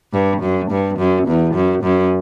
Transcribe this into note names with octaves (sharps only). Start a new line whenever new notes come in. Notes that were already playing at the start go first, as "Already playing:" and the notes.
G2
F#2
G2
F#2
E2
F#2
F#2